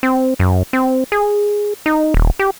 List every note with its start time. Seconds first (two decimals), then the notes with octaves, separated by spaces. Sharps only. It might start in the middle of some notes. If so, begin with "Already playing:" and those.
0.03 C4
0.39 F#2
0.73 C4
1.12 G#4
1.86 D#4
2.14 D#1
2.39 G4